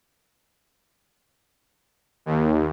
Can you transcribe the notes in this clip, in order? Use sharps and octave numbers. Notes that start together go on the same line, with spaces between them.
D#2